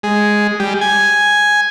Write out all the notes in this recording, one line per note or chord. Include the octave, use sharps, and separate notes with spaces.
G#3
G3
G#5